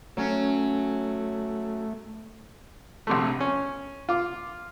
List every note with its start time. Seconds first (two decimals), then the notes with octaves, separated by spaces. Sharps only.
0.17 F#3 A3 C#4
3.07 A#1 C3 A3
3.40 C#4
4.09 F4 D6